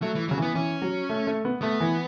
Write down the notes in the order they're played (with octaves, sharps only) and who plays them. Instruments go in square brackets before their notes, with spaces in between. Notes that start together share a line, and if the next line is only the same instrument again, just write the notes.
[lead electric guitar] F#3 [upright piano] A3
[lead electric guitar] E3
[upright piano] C#3 [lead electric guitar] F#3
[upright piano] E3 [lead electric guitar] B3
[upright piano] E3 [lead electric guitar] C#4
[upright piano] F#3
A3
A3
B3
[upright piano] A3 [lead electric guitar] B3
[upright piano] E3